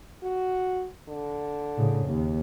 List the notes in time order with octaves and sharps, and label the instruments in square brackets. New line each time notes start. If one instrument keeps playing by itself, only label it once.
[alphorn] F#4
D3
[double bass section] A2 C#3
D#2